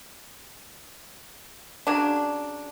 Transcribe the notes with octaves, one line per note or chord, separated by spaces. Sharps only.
C#3 F#3 D4